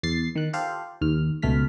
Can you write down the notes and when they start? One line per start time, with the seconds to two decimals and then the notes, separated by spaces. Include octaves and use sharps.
0.03 E2 A6 C7
0.36 D#3 F#6
0.53 F4 G4 A4 C5 F5
1.01 D#2 F6
1.42 C#2 B2 A3 F6 B6